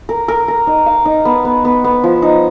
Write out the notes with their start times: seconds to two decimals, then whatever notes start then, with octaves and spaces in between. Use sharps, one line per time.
0.09 A#4
0.28 A#4
0.48 A#4
0.67 D#4
0.86 F5
1.05 D#4
1.25 B3
1.45 B3
1.65 B3
1.84 B3
2.04 F3
2.22 D#4